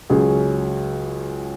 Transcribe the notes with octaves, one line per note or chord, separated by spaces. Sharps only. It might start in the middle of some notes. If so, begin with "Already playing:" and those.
C#2 C#3 F#3 C#4 G#4